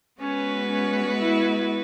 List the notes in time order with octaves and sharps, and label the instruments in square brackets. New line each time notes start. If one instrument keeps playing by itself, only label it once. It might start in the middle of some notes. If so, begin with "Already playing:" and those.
[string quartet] G#3 B3 F#4 B4 [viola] C#4
[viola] C#4
E4